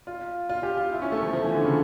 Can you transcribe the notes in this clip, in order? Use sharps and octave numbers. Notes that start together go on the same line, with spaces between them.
F4
F4
G4
F4
E4
C#4
A3
F3
F3
E3
D3
C#3